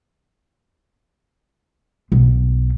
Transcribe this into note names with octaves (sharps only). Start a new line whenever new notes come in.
B1